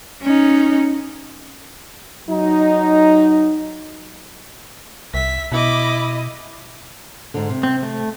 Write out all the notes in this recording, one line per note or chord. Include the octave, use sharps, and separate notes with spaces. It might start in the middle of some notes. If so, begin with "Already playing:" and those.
C#4 D#4
F#3 D#4
C2 E5 B6
B2 E4 D#5 B5 D6
G#2 D3
C3
C4
A3